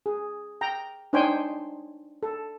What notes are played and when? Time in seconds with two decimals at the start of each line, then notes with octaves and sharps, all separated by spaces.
0.06 G#4
0.61 G5 A#5
1.13 D4 D#4 C5 C#5 G5 G#5
2.23 A4